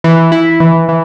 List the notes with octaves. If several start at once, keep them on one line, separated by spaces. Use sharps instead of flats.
E3
E4
E3
E3